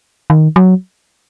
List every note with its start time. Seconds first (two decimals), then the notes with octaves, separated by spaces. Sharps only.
0.30 D#3
0.56 F#3